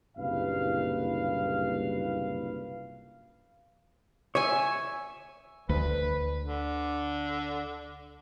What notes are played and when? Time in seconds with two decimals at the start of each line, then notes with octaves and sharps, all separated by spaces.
0.17 F#1 C2 G2 A#2 B4 F5
4.35 C#5 E5 G#5
5.69 D2 B4
6.45 D3